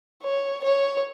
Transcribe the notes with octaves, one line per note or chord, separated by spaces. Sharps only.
C#5
C#5